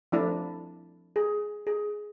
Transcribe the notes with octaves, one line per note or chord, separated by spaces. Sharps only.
F3 A3 D4 E4
G#4
G#4